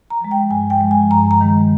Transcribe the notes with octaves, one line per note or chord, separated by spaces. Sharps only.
A#5
F3 G#3
G5
G2 G#5
G5
F3 G#3
G#5
G2 A#5
A#5
D#3 G#3